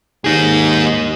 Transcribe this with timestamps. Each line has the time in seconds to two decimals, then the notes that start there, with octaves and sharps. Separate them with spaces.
0.25 D#2 D#4 G#4